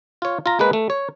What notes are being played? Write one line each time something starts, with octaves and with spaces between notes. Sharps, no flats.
F4 C#5
F4 A#5
G#3 A#3 B4
A3
C#5